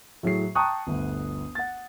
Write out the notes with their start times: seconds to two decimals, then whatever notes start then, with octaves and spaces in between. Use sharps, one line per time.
0.23 A2 F#3 G#4 C7
0.55 G5 A5 A#5 C#6 D#6 F#6
0.87 G1 D2
1.55 F#5 A6